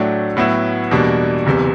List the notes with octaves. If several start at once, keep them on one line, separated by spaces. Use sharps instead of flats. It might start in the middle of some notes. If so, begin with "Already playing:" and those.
Already playing: A2 F#3 A3 D4
A2 F#3 B3 E4
E2 B2 G3 A#3 D4
F#1 E2 C3